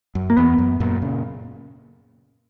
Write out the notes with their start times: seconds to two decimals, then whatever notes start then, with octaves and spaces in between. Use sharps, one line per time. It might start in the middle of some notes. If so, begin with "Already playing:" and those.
0.15 F#2
0.30 A#3
0.37 E2 B3
0.58 F#2
0.80 F#2 A#2
1.02 A#2 C#3